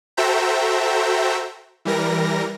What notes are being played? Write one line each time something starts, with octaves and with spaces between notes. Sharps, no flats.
F#4 A4 C5 E5 G5 A#5
E3 G3 A#4 A#6